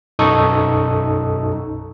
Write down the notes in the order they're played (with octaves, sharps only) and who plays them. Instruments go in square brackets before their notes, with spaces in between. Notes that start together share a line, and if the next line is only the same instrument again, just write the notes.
[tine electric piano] B1 F#2 D#4 A4 C#6 D#6